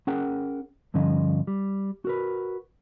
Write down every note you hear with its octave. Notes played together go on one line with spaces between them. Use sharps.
C#4 G#4 A#4 F#5 G5
G2 D3 F3 C#4 D#5
G3
F#4 A#4 B4